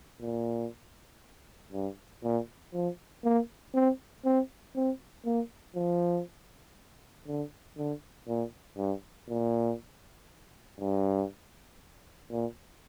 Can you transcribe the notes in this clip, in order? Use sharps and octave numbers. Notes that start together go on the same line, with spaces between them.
A#2
G2
A#2
F3
A#3
C4
C4
C4
A#3
F3
D3
D3
A#2
G2
A#2
G2
A#2